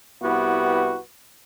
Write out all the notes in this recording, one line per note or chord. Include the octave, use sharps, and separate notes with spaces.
C2 B3 E4 F#4 G4 B4